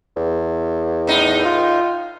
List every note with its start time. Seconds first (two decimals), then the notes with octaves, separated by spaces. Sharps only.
0.17 E2
1.07 A2 D#4
1.45 F4